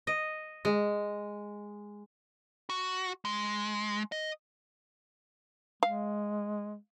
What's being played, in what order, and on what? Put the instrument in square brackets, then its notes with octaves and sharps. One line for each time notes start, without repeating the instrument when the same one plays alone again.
[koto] D#5
G#3
[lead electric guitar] F#4
G#3
D#5
[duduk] G#3 [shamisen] F5